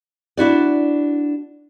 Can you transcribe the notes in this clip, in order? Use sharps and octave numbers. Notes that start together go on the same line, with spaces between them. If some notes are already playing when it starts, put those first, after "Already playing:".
D4 E4 F#4 D5